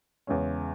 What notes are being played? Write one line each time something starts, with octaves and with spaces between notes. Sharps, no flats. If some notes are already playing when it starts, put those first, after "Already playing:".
E2 C#3 G#3 C#4